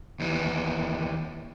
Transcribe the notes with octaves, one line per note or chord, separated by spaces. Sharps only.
D#2 E3